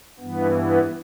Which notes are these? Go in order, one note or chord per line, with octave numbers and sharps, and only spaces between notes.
G2 E3 B3
B3